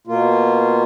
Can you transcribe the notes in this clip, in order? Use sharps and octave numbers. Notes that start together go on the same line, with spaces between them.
B2 A#3 F4